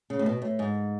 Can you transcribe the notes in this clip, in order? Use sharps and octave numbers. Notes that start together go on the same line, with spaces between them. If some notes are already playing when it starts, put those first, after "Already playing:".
C#3
A2
B2
A2
G#2